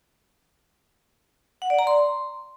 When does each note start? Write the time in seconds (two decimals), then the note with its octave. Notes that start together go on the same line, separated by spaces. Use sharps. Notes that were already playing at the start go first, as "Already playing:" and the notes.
1.62 F#5
1.70 D5
1.79 A#5
1.87 C6